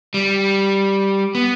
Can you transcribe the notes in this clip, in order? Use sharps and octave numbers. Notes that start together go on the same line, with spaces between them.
G3
B3